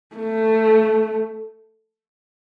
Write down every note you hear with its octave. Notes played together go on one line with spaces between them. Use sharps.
A3